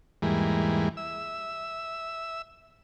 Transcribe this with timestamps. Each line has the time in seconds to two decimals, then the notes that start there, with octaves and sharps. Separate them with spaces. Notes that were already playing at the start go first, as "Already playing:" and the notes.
0.22 E2 G#2 E3 G3 G#3 A#3
0.97 E5 E6